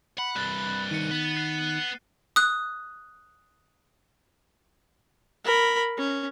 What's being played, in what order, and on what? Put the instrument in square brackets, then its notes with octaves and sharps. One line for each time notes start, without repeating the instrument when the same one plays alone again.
[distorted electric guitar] F#5 [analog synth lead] B5
[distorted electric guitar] C2 G2 [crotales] F#6 A6 G7
[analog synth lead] D#3 [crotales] C#7 D#7
[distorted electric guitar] B3
[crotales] F#6 C7 C#7
[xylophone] D#6 F#6
[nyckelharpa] A#4 B5
C#4